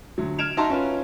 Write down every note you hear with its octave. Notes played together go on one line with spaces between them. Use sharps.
D2 F#3
F6 G#6 D7 E7 F7
D#4 F#4 E5 A5 A#5 C6
C#4 F4 B4